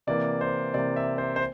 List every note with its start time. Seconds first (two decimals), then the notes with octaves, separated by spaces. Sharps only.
0.07 C3 E3 A#3 D5
0.41 C5
0.74 C3 E3 A#3 D5
0.96 E5
1.18 C5
1.36 C5